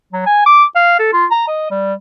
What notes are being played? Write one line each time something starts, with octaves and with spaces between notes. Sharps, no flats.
F#3
G#5
D6
F5
A4
F4
A#5
D#5
G3